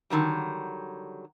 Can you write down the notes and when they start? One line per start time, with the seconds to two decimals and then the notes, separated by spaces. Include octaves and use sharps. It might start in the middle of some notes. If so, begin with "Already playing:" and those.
0.10 D3 D#3 F#3 G3